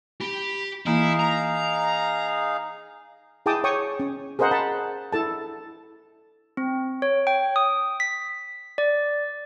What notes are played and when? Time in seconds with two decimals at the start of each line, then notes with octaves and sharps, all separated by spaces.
0.21 G4 B5
0.86 E3 A#3 D#4 E4 G#4 F5
1.20 A#5
3.46 E4 G#4 G5 A5 D6 D#6
3.64 C#5 G5 C#6 D#6
4.00 C#4
4.39 G#4 A#4 C5 D#5 F#5
4.51 F#5 A5 B5
5.13 E4 A4 A5
6.57 C4
7.02 C#5
7.27 G5
7.56 D#6
8.00 B6
8.78 D5